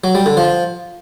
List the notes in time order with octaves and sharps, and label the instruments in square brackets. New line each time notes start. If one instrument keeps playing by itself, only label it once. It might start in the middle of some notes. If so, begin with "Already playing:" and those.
[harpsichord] F#3
G3
D3
F3